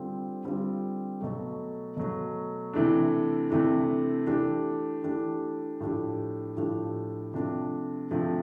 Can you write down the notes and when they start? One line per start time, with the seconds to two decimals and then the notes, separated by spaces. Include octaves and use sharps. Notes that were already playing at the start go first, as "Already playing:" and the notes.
Already playing: D3 G3 C4 F4
0.44 D3 G3 C4 F4
1.21 B2 F#3 A3
1.96 B2 F#3 A3
2.73 C3 E3 A3 D4
3.50 C3 E3 A3 D4
4.27 E3 A3 D4 G4
5.04 E3 A3 D4 G4
5.80 A2 F3 A3 D4 G4
6.57 A2 F3 A3 D4 G4
7.34 C3 F3 A3 D4
8.11 C3 F3 A3 D4